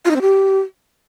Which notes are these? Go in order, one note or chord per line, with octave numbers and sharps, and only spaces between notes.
F4
D#4
C4
G4